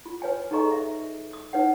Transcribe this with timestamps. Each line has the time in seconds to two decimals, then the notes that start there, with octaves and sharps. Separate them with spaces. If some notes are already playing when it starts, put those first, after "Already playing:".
0.06 F4
0.22 B4 C#5 G#5
0.51 D#4 G#4 A4 D#5 A#5 C#6
0.71 E5
1.33 D#6
1.53 D#4 B4 C#5 F#5